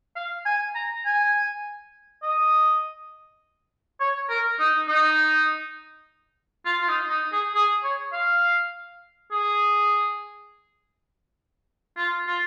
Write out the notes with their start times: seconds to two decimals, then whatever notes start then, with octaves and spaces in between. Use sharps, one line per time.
0.16 F5
0.45 G#5
0.75 A#5
1.05 G#5
2.23 D#5
4.00 C#5
4.29 A#4
4.59 D#4
4.88 D#4
6.66 F4
6.81 F4
6.88 D#4
7.10 D#4
7.32 G#4
7.55 G#4
7.84 C#5
8.13 F5
9.32 G#4
11.97 F4
12.27 F4